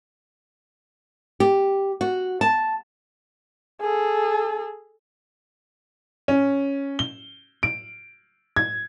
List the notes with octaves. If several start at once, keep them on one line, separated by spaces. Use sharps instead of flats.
G4
F#4
A5
G#4 A4
C#4
G7
D7
G#6